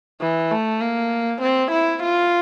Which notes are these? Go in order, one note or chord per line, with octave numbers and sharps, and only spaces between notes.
E3
A3
A#3
C4
E4
F4